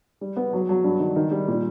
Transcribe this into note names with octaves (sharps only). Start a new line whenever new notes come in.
G3
B3
F#3
F#3
G2
D#3
D#3
G3
A#2